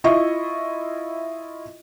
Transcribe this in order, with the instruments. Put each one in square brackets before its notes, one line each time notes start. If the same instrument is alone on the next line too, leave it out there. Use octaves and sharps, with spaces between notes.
[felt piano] E4 F4 D#5 E5 C#6